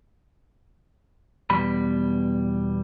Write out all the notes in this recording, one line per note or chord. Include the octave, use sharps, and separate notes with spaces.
E2 B2 G3 B5